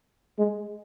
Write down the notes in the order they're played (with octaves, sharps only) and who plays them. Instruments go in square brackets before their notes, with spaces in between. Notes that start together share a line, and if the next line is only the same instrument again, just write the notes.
[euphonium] G#3